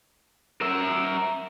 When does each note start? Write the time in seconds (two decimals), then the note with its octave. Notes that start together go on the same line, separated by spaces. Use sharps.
0.61 A#4 E5